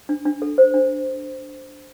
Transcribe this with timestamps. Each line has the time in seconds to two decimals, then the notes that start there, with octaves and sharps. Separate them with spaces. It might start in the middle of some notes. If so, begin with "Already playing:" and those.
0.09 D4
0.25 D4
0.42 A4
0.58 C5
0.74 D4